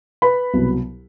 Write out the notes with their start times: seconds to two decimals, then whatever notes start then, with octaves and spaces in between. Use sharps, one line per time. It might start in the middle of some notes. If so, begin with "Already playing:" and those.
0.22 B4 B5
0.53 C2 B2 F#3